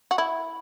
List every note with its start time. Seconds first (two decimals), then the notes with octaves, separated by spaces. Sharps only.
0.11 F#4
0.18 E4